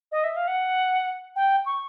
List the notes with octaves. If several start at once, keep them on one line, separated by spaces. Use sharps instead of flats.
D#5
E5
F5
F#5
G5
C#6